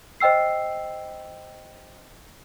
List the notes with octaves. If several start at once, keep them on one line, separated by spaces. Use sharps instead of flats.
C5 D#5 G5 E6 C7